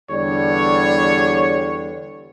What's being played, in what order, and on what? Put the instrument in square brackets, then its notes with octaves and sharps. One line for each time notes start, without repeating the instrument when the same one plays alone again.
[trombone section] E2 D3 G3 [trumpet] C#5